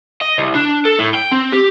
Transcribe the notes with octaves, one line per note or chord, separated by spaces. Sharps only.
D#5
C2
D4
A4
A2
G5
C4
G4